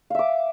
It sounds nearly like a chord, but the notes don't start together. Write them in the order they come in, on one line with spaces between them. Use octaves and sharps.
F5 E5 D6